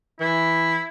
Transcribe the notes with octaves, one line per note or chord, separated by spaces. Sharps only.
E3 E4